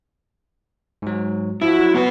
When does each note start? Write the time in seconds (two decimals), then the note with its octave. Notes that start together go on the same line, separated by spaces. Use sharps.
1.02 G#2 F#3
1.62 F3 E4 F#4
1.79 F#3
1.95 B3 F#4 B4